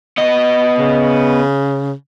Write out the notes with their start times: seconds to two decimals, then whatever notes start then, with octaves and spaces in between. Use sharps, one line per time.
0.17 B3 D#5
0.78 C#3